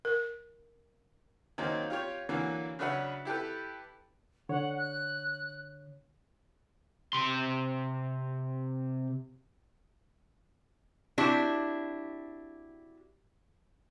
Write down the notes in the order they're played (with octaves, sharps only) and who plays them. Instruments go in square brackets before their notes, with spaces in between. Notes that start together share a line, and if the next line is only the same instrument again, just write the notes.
[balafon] A#4
[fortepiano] D#3 F#3 A#3 C4 C#4 D#4
F4 G4 C#5
D3 E3 F#3 A#3
C#3 F#3 D4 B4 E5 F#5
E4 G4 A4 B4
[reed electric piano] D3 C#5 [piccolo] F#5
[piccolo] F#6
[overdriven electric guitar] C3 C6
[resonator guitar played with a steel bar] C4 D4 E4 F#4 G4